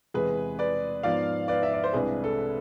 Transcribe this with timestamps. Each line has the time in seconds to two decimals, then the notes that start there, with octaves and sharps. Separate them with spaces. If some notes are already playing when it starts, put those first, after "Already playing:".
0.14 E2 C3 G#3 G#4 B4
0.59 B4 D5
1.03 G#2 F3 B3 D5 F5
1.48 B4 D5
1.63 E5
1.73 D5
1.84 C5
1.93 C2 C3 G#3 D4 G#4 B4
2.24 A4